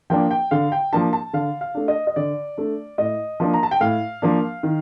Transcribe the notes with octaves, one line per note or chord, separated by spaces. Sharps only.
F3 A#3 D4 G5
G5
D3 F5
G5
F3 A#3 D4 A5
A5
D3 F5
F5
A3 D4
D#5
D#5
D3 D5
A3 D4
A2 D#5
F3 A#3 D4
A#5
A5
G5
A2 F5
F3 A#3 D4
D#3